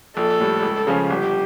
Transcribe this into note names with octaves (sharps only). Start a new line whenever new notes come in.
A#1 A4
A2 G3
C#2
C#3 F3 C#4
G1 G4